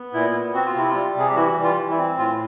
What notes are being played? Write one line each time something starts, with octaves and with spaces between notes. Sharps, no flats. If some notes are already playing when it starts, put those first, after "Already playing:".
Already playing: B3
A#2 E4
B3
C4 F#4
F4
C3 E4
F4
G3
C3 G#4
G4
E3 E4 F#4
G3
F4
E3
E4
C4
A2 F4